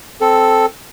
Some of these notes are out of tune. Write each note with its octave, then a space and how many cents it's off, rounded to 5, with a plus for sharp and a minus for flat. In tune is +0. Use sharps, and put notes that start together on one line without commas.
C4 +0 A4 +0